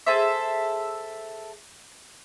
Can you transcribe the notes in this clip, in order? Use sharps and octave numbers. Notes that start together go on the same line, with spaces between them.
G#4 A4 C5 E5